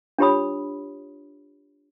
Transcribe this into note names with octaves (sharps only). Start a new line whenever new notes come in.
D4 F4 G4 C#5 B5 D#6